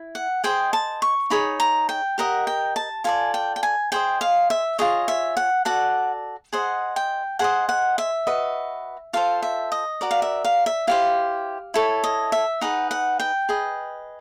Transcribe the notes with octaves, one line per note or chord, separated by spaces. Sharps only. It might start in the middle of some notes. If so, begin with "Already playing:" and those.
Already playing: E4
F#5
G#4 C5 D#5 G5
A5
C#6
D#4 G#4 C#5 B5
A#5
G5
G4 A#4 D#5 F#5
G5
A5
F4 A4 D5 G#5
G5
G5
G#5
G#4 C5 D#5 G5
F5
E5
F4 G#4 C#5 D#5
E5
F#5
F#4 A4 D5 F#5
G#4 C5 D#5 F#5
G5
G#4 C5 D#5 F#5
F#5
E5
F#4 B4 D#5
F4 A4 C5 F5
E5
D#5
F#4 A#4 D5
F5
E5
F5
E5
E4 G4 C5 F5
E4 A4 C#5
D#5
E5
D#4 G#4 B4 F#5
F#5
G5
G#4 B4 D#5